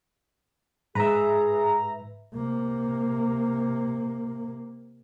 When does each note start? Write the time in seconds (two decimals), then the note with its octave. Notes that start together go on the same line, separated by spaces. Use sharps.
0.95 G#2 G#4 B4 E5 A#5
2.34 C3 A#3